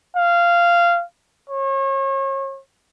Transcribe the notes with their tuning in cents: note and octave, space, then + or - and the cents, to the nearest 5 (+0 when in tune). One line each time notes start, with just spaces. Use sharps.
F5 -15
C#5 -35